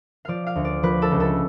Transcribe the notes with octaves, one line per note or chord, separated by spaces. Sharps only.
F3 D5 F5
F5
D2
D5
F3 B4
A4
C#2
A4